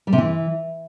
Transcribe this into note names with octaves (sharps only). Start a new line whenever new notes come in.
G3
C3
E3